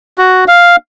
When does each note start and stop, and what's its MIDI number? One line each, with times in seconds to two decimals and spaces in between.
0.18 0.45 66
0.48 0.76 77